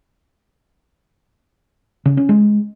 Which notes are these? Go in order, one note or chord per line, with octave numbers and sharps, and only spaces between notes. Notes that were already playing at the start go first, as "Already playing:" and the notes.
C#3
C#4
G#3